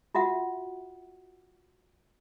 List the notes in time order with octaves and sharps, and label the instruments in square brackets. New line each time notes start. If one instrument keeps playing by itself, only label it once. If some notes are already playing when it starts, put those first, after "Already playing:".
[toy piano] F4 F#4 E5 F#5